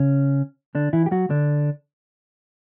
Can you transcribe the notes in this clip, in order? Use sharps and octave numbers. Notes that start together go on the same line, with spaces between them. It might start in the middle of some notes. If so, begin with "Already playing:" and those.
Already playing: C#3 C#4
D3 D4
E3 E4
G4
F#3 F#4
D3 D4